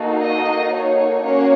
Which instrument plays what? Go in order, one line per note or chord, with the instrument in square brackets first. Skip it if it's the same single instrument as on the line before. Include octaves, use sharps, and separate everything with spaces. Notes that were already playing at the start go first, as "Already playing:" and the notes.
Already playing: [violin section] A#3 D#4 F#4 A4
D#5
C#5
A#3 C#4 F#4 C#5